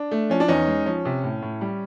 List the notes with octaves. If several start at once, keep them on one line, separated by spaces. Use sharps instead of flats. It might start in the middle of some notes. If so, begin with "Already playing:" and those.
Already playing: D4
A3
F3 C#4
D4
E2 C#4 D#4
G#3
F3 C#4
C3
A2
A2
G3